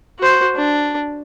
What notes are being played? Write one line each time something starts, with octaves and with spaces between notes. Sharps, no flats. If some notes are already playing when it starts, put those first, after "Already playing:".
F#4 C5
D4